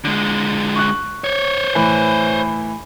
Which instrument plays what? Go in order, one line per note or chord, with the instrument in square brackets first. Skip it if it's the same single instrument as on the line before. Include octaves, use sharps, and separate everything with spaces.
[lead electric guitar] D3 G#3
[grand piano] C#6 F#6
[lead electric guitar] C5 C#5
[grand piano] A2 E3